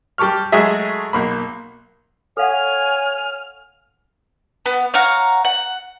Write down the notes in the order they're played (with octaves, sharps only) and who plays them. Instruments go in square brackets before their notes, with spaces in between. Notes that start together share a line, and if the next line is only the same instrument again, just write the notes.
[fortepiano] G3 G4 A5 C#6 F6
F#3 G#3 A3 G#4 E5
B1 A#3 B5
[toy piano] A4 F5 F#5 [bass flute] C#5 [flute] G#5 [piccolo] F6
[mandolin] B3
C#5 F5 F#5 A#5
F#5